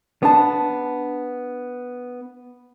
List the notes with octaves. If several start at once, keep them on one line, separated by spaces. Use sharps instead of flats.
B3 D4 A5